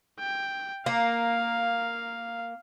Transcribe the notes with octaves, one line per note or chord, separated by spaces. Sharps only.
G5
A#3 F5